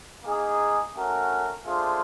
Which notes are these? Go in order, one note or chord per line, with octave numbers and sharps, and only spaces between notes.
A#3 D#4 G#4
A3 C#4 F#4 A#4
A3 D4 F4 G#4 C5